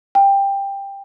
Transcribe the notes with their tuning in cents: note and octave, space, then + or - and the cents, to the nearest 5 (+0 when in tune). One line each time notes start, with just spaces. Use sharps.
G5 +15